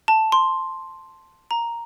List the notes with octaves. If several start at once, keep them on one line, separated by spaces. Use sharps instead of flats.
A5
C6
A#5